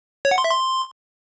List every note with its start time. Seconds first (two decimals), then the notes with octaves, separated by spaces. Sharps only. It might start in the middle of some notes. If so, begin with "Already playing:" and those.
0.25 C#5
0.31 F#5
0.38 C6
0.44 E5
0.51 C6